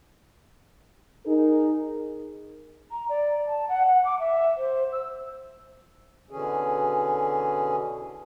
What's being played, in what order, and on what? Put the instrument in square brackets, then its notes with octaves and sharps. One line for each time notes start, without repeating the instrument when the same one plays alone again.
[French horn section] D#4 G#4 A#4
[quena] A#5
D5
A5
F#5
F#5
D6
E5
C5
E6
[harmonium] B2 D3 E3 C#4 G#4